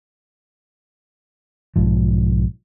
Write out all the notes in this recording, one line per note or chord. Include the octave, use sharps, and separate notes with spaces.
B1 G#2 F3